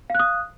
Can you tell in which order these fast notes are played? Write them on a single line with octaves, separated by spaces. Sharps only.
F5 F#6 D#6